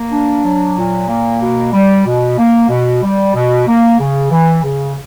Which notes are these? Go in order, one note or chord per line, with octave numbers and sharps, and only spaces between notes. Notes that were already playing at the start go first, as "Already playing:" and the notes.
Already playing: A#3
D4
F#3
A#2
A#3
B2
G3
B2
A#3
B2
G3
B2
A#3
C#3
E3
C#3